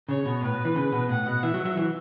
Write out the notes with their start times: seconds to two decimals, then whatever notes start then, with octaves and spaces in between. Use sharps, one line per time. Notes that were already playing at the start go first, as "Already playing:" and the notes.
0.09 C#3 C#5
0.26 B2
0.42 A2 B4
0.54 B2
0.65 E3
0.76 C#3
0.92 B2
1.09 A2 F#5
1.26 B2
1.43 E3 E5
1.54 F#3
1.65 F#3
1.77 E3